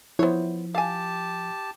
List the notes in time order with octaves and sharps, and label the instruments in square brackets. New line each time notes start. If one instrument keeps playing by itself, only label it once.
[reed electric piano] F3 [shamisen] B3 C#5 [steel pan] E4 C5
[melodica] G4 A5 [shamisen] F5 G#5